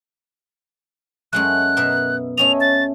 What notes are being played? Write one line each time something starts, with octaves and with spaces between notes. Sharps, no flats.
F#2 G#3 A3 F#6
B2 A#4 E5
A3 C#4 D#5 F7
A6